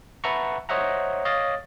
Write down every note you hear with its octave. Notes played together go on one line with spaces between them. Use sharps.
B4 E5 F#5 A5 A#5 C#6
C5 C#5 D#5 E5 F#5 A#5
C#5 D#5 F5 A6